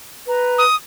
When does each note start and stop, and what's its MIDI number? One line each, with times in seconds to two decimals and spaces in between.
0.28 0.62 71
0.28 0.62 82
0.58 0.76 87